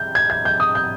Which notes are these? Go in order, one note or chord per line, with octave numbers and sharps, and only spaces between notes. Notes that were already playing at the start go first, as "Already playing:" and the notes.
Already playing: G6
G#6
G#6
G6
D#6
G6